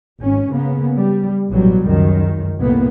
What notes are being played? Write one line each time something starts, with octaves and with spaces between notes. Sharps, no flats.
G#1 C#4
C#3 A#3 B3
G3
A1 B2 F#3 G3
C#2 F#2 D#3
C2 A2 A#3 B3